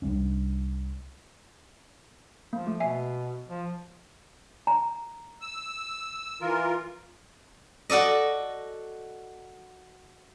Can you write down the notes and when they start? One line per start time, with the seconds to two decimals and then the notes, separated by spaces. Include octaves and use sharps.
0.02 C2 G3 C#4 D4
2.53 F3 A#3
2.67 A3
2.80 B2 E5 G#5 C7
3.49 F3
4.67 A#5
5.41 E6
6.41 E3 F4 A#4
7.90 F#4 A4 D5 D#5